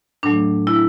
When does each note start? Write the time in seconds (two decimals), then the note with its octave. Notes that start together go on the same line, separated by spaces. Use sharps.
0.23 A2 F#3 A3 D4
0.67 E4